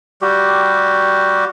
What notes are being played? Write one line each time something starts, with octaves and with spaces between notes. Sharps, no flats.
G3 F#4 G4